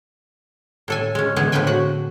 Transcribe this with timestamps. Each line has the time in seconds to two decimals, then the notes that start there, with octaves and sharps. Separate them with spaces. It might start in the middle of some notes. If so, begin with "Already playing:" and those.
0.88 A2 A4 G#5
1.15 G#3 C#4
1.36 D3 E3 G#3 B3 G#4
1.52 A2 D3 F3 B4 G5 G#5
1.67 F#4 F#5